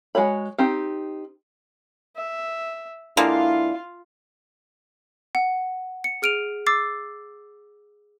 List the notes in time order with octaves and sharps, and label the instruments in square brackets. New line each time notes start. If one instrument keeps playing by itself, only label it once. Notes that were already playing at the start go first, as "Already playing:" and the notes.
[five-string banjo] G#3 F#4 C#5 B5
C4 D#4 G4
[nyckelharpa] E5
[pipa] D3 G#3 A#3 [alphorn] E4 [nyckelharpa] F4 F5
[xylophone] F#5
C#7
G#4 F6 D7 D#7 F7
D6 E6 A6 C7